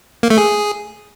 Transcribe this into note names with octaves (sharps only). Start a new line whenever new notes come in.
A#3
A3
G#4